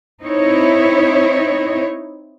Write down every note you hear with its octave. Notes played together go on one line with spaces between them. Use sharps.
C4 D#4 E4 C#5